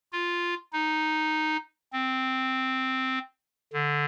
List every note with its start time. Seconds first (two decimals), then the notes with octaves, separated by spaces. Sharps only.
0.12 F4
0.73 D#4
1.93 C4
3.73 D3